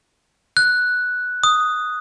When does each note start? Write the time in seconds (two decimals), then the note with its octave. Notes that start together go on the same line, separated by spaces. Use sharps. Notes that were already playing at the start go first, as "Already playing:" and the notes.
0.57 F#6
1.44 D#6